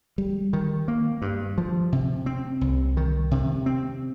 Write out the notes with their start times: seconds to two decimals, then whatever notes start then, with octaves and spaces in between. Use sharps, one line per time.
0.18 G3
0.53 D#3
0.88 A#3
1.22 G2
1.58 F3
1.92 C3
2.26 C4
2.61 C2
2.97 D#3
3.31 C3
3.66 C4